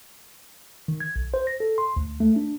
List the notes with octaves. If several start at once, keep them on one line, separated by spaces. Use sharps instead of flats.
D#3
G#6
B1
C5
A#6
A4
C6
D2
A3
D4